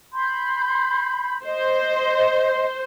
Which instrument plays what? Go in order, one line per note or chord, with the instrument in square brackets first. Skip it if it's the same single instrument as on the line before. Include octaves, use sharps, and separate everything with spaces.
[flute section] B5 C6 G6
[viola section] C5 [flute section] D#5